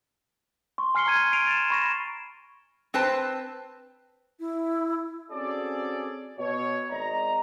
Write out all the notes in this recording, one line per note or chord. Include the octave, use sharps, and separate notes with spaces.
C6 C#6
G#5 F6 C7 C#7 G7
A#5 G#6 D#7
C7 D7 D#7 F7
A6 E7
B5 C#6 A#6 E7
C4 B4 C5 A5
E4
C4 C#4 F#4 G#4 A4 D5
B2 C#5
G#1 D5 D#5 A#5